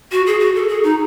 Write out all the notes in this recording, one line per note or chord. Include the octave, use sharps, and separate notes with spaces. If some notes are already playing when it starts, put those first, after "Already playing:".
F#4
G#4
F#4
A4
G#4
D#4